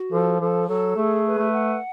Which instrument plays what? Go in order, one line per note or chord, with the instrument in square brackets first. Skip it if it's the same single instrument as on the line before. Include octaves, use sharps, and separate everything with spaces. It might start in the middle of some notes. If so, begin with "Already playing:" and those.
Already playing: [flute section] F#4
[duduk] F3 [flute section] A4
[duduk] F3 [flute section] A4
[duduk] F#3 [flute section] A4
[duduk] A3 [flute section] G#4
[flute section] B4
[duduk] A3
[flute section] F#5